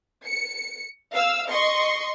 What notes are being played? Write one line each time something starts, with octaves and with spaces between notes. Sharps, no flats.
C#7
F5 E6
D#5 C6 C#6